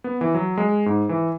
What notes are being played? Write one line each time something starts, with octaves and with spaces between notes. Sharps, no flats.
B3
E3
F#3
G#3
G#2
E3